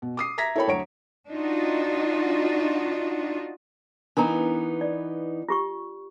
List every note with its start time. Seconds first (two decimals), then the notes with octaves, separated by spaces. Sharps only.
0.02 B2
0.17 D6 D#6 C7
0.38 E5 A#5 G#6 A#6 B6
0.55 E4 A4 A#4 C#5 G5 B5
0.67 D2 F#3 C#5 A#5 D7
1.28 D4 D#4 F4 F#4
4.17 E3 B3 D4 D#4 A#4 A#5
4.81 D5
5.49 F4 G4 C#6